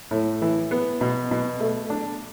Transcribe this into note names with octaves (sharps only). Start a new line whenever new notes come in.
A2
E3
B3
B2
B2
A3
D4